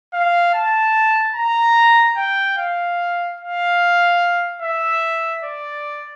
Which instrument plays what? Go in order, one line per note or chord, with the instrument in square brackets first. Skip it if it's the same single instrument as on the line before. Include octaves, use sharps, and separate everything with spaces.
[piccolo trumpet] F5
A5
A#5
G5
F5
F5
E5
D5